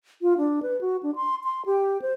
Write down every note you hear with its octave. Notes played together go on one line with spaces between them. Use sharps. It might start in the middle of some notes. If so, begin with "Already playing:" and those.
F4
D4
B4
F#4
D4
C6
C6
G4
C5